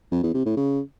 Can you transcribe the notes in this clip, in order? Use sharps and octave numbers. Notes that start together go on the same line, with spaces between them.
F2
E2
C3
A2
C#3